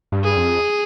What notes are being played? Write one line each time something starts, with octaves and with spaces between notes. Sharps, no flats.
G2
G#4
F2